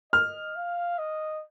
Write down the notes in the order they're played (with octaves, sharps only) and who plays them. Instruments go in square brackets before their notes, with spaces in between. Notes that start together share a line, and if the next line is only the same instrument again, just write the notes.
[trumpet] D#5 [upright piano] F6
[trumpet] F5
D#5